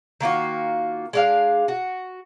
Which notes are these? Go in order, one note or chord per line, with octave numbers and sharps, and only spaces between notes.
D#3 A#3 F4 F#4
G#3 D4 F5
F#4